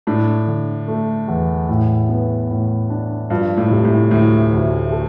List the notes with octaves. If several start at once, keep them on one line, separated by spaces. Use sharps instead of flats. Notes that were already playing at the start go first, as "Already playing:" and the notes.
A2 D4
D3
A3
E2
A2
B3
A2
D4
G2 F3
A2
C3
A2
D2 A2
D2
A4